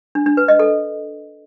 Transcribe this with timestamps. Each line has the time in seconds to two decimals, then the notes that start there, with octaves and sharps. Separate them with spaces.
0.15 D4
0.26 D4
0.37 B4
0.48 D#5
0.60 A4